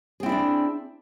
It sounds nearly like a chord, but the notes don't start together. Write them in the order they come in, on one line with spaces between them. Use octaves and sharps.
G#4 C4 E4 D5 D4